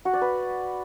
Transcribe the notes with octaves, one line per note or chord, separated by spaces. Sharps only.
F#4
D5
B4